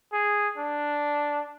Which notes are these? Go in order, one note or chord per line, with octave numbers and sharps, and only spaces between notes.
G#4
D4